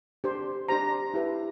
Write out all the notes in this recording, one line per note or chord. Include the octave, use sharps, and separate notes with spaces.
D4 G4 C5
D4 G4 C5 A#5
E4 G4 B4